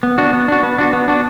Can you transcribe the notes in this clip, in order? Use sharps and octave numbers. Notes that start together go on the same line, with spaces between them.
B3
D4 F#4
B3
D4 F#4
B3
D4 F#4
B3
D4 F#4